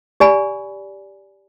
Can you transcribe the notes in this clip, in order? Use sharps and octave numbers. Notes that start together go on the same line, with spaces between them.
G4 D5 G#5 B5